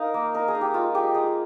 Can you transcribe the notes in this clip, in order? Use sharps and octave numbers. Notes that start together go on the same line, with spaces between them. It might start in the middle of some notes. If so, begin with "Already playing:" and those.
Already playing: D#4 A#4 F5
A#3
D#4 A#4
G#4
D#4
G4
G#3 F4
G#3 G4
D#4 G#4